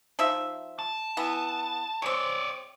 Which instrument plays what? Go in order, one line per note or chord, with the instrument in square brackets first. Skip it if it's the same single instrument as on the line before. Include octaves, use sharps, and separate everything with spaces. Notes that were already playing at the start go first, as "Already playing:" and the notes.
[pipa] F3 D#4 E5
[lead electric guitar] A5
[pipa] E3 B3
[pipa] G#3 C4 [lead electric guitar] C#5 D5